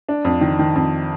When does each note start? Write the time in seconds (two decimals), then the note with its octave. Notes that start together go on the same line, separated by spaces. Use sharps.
0.08 D4
0.25 F2
0.41 D#3
0.59 D#3
0.75 F2